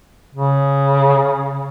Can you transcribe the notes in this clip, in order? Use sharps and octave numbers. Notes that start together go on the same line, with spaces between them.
C#3